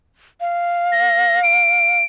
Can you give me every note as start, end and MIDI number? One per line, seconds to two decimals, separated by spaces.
0.41 2.00 77
0.92 1.42 94
1.43 2.04 98